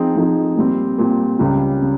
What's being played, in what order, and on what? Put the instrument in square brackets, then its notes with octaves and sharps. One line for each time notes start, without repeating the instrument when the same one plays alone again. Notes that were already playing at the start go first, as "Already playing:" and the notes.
Already playing: [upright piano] F3 C4 D#4 G#4
F3 C4 D#4 G#4
A#2 G3 C4
A#2 G3 C4
C#2 C#3 G3
C#3